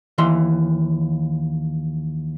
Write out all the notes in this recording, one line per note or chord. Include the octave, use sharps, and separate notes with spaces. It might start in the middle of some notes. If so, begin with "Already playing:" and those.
D#2 E3 C6